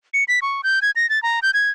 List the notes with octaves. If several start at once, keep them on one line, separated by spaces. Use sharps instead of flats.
C#7
B6
C#6
G6
G#6
A#6
A6
A#5
G6
G#6